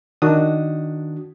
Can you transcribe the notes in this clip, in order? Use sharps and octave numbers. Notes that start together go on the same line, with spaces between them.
D#3 D4 F#4 D#6